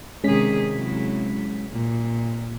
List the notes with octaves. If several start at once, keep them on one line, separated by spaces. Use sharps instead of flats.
C3 D#3 G#3 C#4 G#4 B6
C3 F#3 E4
A#2